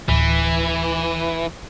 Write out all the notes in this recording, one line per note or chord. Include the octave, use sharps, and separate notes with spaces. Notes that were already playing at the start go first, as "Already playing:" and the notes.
D1 E3